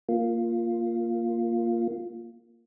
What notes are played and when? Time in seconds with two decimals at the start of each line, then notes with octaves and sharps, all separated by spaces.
0.09 A#3 F4